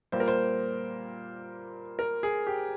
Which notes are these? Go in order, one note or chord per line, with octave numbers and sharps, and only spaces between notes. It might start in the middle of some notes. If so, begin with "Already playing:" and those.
A#2 G3 A#3 C5
A#4
C5
A#4
G#4
G4